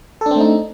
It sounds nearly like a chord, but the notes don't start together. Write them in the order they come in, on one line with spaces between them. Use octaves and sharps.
A4 D4 C4 A3 D#4